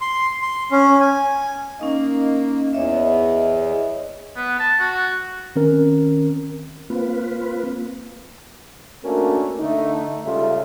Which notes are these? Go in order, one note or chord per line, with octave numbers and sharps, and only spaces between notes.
C6
C6
C#4
G#5
A#3 C#4 D#4 D#5
E2 C#5 D#5 E5
B3
A5
F#4
D#3 C4 C#4 A#4
A#3 C4 F4 B4
A3 A#3 C#4 D4 F#4 A#4
D3 A3 D#4
C#2 C#3 G3 F4 A4 E5